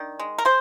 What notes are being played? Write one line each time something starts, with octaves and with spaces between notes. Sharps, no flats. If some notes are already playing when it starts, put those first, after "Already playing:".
Already playing: D#3 D4
G#3
A#4
G#3 C5